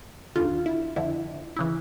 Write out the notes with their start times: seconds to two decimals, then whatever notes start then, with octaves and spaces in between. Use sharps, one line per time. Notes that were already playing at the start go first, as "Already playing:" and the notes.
0.36 D#2 D3 F4
0.66 E4
0.96 F2 D3 E4
1.56 C#3 E3 E4